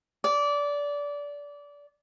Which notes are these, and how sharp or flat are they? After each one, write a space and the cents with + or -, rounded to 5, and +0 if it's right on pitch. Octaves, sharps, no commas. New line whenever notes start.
D5 -20